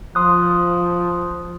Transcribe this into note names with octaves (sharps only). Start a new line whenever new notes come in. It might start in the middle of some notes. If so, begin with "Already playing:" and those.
F3 C6 D#6 F#6